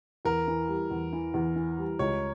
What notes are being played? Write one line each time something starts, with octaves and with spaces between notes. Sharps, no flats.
E2 A#4
E3
G3
E2
E3
E2
E3
G3
C#2 C#5